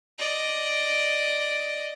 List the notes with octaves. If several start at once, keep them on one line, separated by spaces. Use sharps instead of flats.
D5 D#5